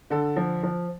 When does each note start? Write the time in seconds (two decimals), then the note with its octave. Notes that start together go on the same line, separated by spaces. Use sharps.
0.10 D3 A4
0.36 F3
0.63 F3